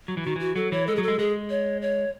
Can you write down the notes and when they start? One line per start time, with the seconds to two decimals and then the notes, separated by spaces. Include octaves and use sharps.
0.08 F#3
0.17 E3
0.24 D#3 F#4
0.36 E3 F#4
0.56 F#3 A4
0.71 E3 C#5
0.87 G#3 A4
0.96 F#3 G#4
1.03 A4
1.08 G#3
1.19 G#3 G#4
1.50 C#5
1.82 C#5